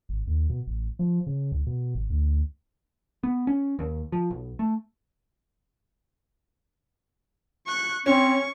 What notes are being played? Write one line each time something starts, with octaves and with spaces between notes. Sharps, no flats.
G#1
D#2
B2
A1
F3
C#3
C#2
B2
G#1
D2
B3
C#4
D#2
F3
B1
A3
C#6 F#6
C4 C#4 C#6